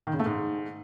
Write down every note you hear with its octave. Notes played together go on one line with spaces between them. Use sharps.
D#3
C#3
A3
G#2